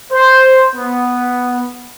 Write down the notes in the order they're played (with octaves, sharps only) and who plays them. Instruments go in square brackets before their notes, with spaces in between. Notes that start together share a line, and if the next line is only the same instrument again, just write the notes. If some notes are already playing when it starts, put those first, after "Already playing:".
[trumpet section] C5
B3